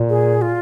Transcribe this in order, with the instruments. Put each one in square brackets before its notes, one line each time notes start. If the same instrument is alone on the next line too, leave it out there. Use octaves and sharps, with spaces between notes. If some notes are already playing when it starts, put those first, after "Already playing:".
Already playing: [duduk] A#2
[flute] G#4
F4